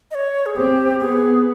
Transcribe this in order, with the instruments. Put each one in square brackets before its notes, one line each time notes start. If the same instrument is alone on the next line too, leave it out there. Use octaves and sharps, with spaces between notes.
[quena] D#5
C#5
G#4
[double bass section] C4 [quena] G4
[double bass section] B3 [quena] G#4